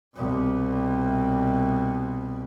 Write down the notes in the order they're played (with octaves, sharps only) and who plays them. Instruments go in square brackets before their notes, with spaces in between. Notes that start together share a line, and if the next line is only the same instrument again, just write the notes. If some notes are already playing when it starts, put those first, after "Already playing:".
[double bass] C2 B2